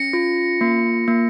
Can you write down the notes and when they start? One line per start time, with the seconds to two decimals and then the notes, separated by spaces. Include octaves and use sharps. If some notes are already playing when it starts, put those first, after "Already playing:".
Already playing: C#4 A#6 C#7
0.13 F4
0.61 A#3
1.08 A#3